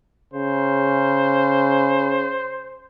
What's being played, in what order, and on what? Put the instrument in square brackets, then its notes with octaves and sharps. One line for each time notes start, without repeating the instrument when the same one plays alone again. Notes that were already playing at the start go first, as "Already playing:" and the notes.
[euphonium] C#3 [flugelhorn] C5